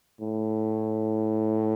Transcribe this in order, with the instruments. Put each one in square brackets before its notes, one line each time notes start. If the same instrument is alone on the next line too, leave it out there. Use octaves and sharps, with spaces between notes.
[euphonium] A2